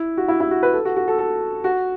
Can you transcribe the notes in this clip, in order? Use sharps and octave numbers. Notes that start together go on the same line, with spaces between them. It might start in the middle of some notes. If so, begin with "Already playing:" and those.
Already playing: E4
F#4
E4
E4
F#4
B4
A4
F#4
F#4
A4
A4
F#4